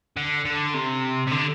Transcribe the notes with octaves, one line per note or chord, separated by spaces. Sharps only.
D3
D3
C3
C3
D3